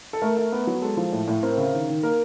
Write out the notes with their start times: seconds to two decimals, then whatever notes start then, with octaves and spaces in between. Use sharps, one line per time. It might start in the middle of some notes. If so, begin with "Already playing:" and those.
0.13 A4
0.22 A3 A#4
0.37 A3
0.52 B3
0.67 F#3
0.82 G#3 A4
0.97 F3
1.12 A2
1.27 A2
1.43 C4 A#4
1.57 C#3
1.73 D#3
1.88 D#3
2.03 A#3 A#4